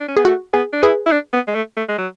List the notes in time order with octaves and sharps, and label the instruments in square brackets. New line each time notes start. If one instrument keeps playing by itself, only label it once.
[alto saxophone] D4
C#4
[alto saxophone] B3 [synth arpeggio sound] G#4
[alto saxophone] A3 [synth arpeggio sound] F#4
[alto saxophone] B3 [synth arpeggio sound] G#4
[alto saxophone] D4
[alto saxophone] E4 [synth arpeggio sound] G#4 B4
[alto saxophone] E4
D4
B3
G#3
A3
A3
G#3
F#3